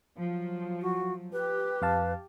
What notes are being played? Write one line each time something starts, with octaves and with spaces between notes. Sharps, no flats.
F3 F#3
F#4
G4 B4
F2 F5 A5